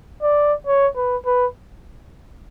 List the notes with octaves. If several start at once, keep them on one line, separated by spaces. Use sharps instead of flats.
D5
C#5
B4
B4